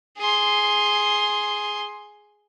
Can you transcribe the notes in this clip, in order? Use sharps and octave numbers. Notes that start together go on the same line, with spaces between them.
G#4 C6